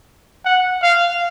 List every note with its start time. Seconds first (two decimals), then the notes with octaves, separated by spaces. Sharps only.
0.45 F#5
0.83 F5